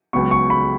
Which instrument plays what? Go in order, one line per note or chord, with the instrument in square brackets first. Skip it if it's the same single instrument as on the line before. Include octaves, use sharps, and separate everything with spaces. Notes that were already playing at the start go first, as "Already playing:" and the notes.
[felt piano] C#2 C#3 F#3 B3 [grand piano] C#6
[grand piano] C#6
B5